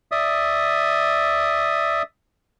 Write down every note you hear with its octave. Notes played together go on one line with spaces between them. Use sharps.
D5 E5 D#6